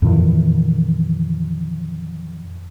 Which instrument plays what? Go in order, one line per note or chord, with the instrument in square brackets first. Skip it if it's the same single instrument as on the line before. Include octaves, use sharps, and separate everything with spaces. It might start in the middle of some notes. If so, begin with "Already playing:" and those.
[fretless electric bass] F2 A#2 D#3 E3